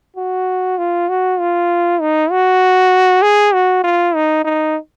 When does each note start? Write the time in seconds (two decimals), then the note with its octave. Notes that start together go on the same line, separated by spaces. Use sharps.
0.16 F#4
0.78 F4
1.09 F#4
1.39 F4
2.01 D#4
2.31 F#4
3.22 G#4
3.54 F#4
3.84 F4
4.15 D#4
4.45 D#4